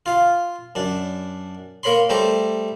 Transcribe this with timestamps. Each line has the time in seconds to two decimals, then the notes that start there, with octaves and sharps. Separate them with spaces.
0.06 F4 F5
0.75 F#2 D4
1.83 A#3 A#4 C#5 B5 C6
2.09 G3 A3 G4 C5 A#5